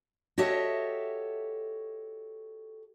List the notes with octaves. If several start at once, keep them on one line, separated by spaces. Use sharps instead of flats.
F#4 G4 A4 C#5 D#5 E5